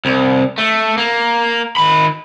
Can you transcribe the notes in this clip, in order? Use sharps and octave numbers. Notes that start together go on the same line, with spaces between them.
C2
A3
A#3
D#3 B5